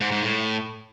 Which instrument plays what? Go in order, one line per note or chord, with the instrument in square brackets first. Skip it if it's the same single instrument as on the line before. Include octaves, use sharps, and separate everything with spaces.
[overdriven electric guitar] G#2
G#2
A2